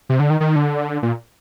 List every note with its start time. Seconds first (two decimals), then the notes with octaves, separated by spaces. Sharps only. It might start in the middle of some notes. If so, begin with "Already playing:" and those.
0.09 C3
0.20 D3
0.30 D#3
0.40 D#3
0.56 D3
1.03 A#2